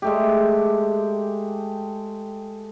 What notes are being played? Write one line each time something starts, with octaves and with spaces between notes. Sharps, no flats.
G#3 A3 G4